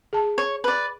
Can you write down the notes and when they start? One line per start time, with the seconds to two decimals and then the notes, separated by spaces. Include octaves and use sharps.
0.13 G#4 A5
0.38 C#5
0.64 B4 D5